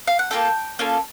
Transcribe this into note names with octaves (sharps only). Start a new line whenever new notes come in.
F5
F#5
A#3 C#4 F4 A4 G5
A#3 C#4 F4 A4